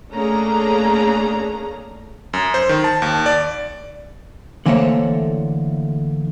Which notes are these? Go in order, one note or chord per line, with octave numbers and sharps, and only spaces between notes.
A3 A#3 C#4 D4 G#4 A#5
F#2
C5
D#3
A5
D#2
D5
D3 E3 A3 A#3 C5 C#5